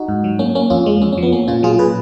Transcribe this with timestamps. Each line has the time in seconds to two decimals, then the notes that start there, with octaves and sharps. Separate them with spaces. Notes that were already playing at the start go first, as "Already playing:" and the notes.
Already playing: D#4 F#4
0.08 G#2
0.24 F#3
0.39 A#3 C#4
0.55 A#3 C#4
0.70 F2 C#4 F4
0.86 G#3
1.02 F2 C#4
1.13 F3 C#4
1.23 B3
1.32 A#3 C#4
1.48 A#2 C#4 F4
1.63 F#3 F4 G#4
1.79 A#2 G#4 B4